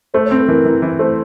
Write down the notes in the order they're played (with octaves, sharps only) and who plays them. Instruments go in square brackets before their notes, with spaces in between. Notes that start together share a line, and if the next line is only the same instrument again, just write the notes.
[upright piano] A3 [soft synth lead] C5
[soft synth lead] C#5
[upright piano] C4
[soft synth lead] B4
A4
[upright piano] E3 [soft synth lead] A#4
[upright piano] E3
E3
[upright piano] A3 [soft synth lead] C5